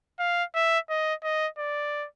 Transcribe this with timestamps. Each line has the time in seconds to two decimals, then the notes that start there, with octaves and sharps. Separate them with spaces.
0.19 F5
0.54 E5
0.90 D#5
1.23 D#5
1.58 D5